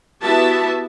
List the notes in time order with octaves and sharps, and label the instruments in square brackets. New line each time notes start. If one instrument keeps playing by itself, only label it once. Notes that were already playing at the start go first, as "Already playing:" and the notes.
[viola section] B3 E4 F#4 G4 E5 A5